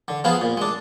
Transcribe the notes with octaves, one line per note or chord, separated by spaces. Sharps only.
D3
F3 B3 F4 G#4
A#2
G#3 D4